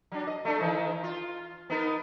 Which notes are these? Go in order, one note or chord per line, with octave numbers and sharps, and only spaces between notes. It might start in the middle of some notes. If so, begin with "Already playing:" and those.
F#3 D4
D#5
A3 D4 A4
D#3 E3 D#4
F4
B3 D#4 A#4